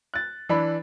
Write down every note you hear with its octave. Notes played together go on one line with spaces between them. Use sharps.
F#6 A6
E3 D4 B5